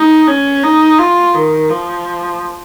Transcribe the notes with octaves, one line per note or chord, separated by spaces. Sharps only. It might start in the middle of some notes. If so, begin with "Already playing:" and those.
Already playing: D#4
C#4
D#4
F4
D#3
F3